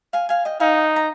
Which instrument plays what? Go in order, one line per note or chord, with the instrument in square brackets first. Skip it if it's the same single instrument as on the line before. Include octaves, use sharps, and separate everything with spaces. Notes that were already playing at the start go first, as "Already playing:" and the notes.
[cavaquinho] F5 G#5
F5 G#5
D#5 G5
[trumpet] D#4 [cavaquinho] F5 G#5
[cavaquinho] A#5